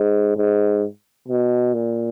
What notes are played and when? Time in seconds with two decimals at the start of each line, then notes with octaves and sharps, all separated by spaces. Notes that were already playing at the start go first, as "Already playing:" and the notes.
Already playing: G#2
0.36 G#2
1.29 B2
1.74 A#2